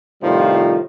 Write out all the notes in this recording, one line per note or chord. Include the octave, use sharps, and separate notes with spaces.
A2 C3 D#3 F3 G3 F4